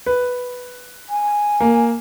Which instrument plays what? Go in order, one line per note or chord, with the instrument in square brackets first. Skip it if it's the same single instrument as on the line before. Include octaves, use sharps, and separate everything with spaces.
[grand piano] B4
[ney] G#5
[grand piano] A#3